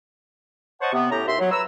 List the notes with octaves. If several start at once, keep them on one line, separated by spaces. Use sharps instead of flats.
C5 C#5 D#5 F#5 A5 C#6
C3 B3
A2 C#4 G4 A#5
D#2 E5 C6
F#3
B4 C#5 A#5 E6